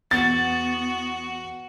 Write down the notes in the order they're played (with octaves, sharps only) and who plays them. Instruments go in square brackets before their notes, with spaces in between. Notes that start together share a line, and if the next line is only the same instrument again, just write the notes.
[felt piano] E2 [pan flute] B3 [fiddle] F#4 [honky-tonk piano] A6